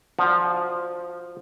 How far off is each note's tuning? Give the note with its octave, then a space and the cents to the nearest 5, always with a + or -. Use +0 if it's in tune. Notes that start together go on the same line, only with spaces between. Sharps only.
F3 +0 D4 +0 F#4 -25